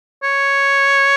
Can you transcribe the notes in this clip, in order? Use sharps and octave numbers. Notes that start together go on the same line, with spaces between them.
C#5